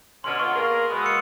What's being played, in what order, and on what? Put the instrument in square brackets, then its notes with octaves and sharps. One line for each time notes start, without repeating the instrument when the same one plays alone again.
[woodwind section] B2 D3 C#4 [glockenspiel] C6 F6
[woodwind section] B3 F4 [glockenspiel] C#6
[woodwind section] A#3 G#4 A#4
B2 G#3 B3
[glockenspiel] E6 C#7